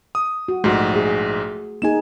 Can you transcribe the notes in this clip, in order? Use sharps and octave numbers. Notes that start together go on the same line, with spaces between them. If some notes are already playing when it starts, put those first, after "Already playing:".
D#6
F#4
A#1 G#2 A3 F#4
G#4
A#3 D#4 G#4 G#5 E7